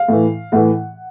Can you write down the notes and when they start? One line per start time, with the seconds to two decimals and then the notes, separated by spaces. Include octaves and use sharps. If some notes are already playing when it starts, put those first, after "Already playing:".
Already playing: F5
0.08 A2 E3
0.52 A2 E3 F#5